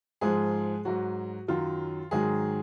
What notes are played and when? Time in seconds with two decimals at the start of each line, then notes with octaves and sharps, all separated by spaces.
0.21 G#2 F3 G#3 G#4
0.85 G#2 F#3 F#4
1.48 F#2 D#3 F#3 F4
2.11 G#2 D#3 F#3 G#3 G#4